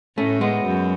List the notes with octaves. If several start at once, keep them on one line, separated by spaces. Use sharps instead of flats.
A2 A3 C#4
G#3 B3
F#2